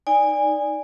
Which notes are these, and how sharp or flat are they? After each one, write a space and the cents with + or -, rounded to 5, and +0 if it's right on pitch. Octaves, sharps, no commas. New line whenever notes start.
D#4 +0 D5 -5 G#5 -20